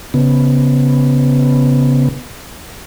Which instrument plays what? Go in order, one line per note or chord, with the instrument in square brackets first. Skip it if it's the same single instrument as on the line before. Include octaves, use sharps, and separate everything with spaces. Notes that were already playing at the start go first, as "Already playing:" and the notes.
[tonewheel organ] C#3 B3